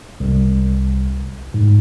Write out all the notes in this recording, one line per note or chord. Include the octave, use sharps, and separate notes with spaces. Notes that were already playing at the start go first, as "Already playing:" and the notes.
C2
G#2